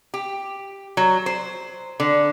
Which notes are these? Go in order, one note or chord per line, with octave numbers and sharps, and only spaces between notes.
G4
F#3
C5
D3